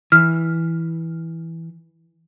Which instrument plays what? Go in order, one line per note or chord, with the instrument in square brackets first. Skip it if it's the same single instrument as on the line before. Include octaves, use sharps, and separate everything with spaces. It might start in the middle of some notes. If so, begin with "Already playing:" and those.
[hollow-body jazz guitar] E3 [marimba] F6